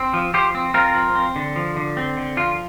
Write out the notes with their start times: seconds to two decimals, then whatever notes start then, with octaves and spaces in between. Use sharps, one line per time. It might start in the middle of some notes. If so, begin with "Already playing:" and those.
Already playing: C4
0.14 F3
0.34 F3 G4 C5
0.55 C4
0.74 C4 F4 A#4
0.95 F3
1.15 C4
1.36 D3
1.56 F3
1.76 D3
1.97 C4
2.17 D3
2.37 F3 F4